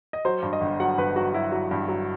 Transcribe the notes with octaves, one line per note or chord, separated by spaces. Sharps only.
D#5
F#3 C5
G2
D#5
G1
F#3 F#5
G1 B4
F#3 F#4
F#3 E4
F#3
G2
F#3